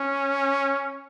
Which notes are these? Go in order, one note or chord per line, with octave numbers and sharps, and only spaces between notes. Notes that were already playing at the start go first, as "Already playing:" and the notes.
Already playing: C#4